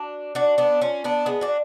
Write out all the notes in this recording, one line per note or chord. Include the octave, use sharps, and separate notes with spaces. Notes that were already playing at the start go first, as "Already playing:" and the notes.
Already playing: D4 F#4
D4 F#4
B3 D4
C#4 F4
B3 D4
G#3 B3
D4 F#4